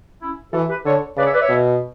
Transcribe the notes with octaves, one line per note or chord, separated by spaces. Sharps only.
C#4 E4
E3 F#4 A4
G4 B4
D3 A4 C#5
C#3 B4 D5
C#5 E5
B4 D5
C#5 E5
B2